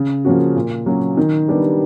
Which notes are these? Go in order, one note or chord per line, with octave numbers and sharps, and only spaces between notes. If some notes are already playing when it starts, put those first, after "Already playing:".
Already playing: C#3
F3 A#3 C#4 F#4
A#2
F#3 A#3 C#4 F#4
D#3
G3 B3 D4 G4